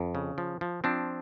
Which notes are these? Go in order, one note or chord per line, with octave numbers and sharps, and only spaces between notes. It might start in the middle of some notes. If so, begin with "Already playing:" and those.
Already playing: F2
C#3
F3
F3
F3 C4 D4